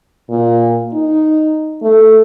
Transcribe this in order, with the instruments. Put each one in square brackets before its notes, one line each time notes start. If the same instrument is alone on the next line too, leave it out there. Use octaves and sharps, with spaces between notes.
[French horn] A#2
D#4
A3